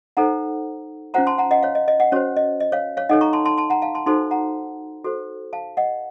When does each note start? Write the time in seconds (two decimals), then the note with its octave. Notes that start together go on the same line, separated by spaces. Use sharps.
0.17 D#4 A4 C5 F#5 A#5
1.14 C#4 F4 C5 F#5 A#5
1.27 A5 C6
1.38 F#5 A#5
1.51 D#5 F#5
1.63 C#5 F5
1.75 D#5
1.88 D#5
2.00 D#5 F#5
2.12 C#4 F#4 C5 C#5
2.37 D#5
2.60 D#5
2.72 C#5 F5
2.97 C#5 F5
3.09 D#4 A4 C#5 D#5 F#5
3.21 A#5 C#6
3.33 A5 C6
3.45 A5 C6
3.58 A5 C6
3.70 F#5 A#5
3.82 F5 A5
3.95 A5 C6
4.06 D#4 F#4 A4 C5 A5 C6
4.31 F#5 A#5
5.04 F#4 A4 C5
5.53 F5 A5
5.77 D#5 F#5